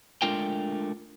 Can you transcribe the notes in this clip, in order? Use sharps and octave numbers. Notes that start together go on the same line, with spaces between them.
G#3 A3 D4 F4 A#4 G5